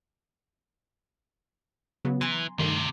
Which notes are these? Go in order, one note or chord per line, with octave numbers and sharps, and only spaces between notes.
C#3 F#3 B3
E3 G#5 A#5 C6
D2 G2 C3 D#3 A3